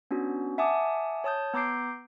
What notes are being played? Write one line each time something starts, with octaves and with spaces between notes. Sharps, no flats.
B3 C#4 D4 F#4
E5 F#5 G#5 A5 D6 D#6
C#5 A5 D#6 G6
B3 A#5 D6 G6 C7 D7